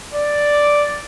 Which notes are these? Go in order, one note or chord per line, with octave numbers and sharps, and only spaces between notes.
D5